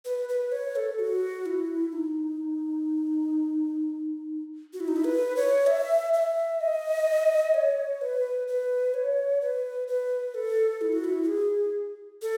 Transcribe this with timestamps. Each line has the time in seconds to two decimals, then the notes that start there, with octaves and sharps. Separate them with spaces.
0.05 B4
0.29 B4
0.52 C#5
0.76 A4
0.99 F#4
1.46 E4
1.92 D#4
4.73 F#4
4.80 E4
4.88 D#4
4.96 E4
5.04 B4
5.36 C#5
5.67 E5
6.13 E5
6.61 D#5
7.54 C#5
8.01 B4
8.47 B4
8.94 C#5
9.41 B4
9.87 B4
10.34 A4
10.81 E4
10.92 F#4
11.04 E4
11.28 G#4
12.22 A4